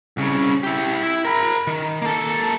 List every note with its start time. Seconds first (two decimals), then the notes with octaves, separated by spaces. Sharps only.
0.17 C2 C#3
0.63 E4 G4
1.03 E4
1.25 A#4 B5
1.67 D#3
2.01 A#3 A4